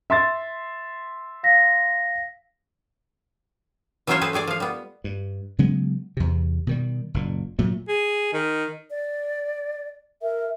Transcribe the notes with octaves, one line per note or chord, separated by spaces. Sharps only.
E5 C6 A6
F5 A#6 B6
E3 F#3 C#4 F4 C5 C#5
G#4 A4 B4 C5
A3 G4 G#4 D5
F3 F5
G3 B3
G2
C#3 F#3 G#3 B3
E2 C3
B2 D#3 G3
F#1 A#2
A#2 F#3 A3
G#4
D#3
D5
A#4 E5